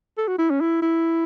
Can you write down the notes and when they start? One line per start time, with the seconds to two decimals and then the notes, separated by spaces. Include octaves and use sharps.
0.17 A4
0.28 F#4
0.38 E4
0.50 C#4
0.60 E4
0.82 E4